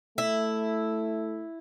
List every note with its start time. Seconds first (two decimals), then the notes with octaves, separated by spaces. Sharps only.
0.18 A3 E4